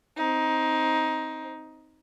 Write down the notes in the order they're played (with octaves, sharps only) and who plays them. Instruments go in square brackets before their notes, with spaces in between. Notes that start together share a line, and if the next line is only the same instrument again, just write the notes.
[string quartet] C4 D#4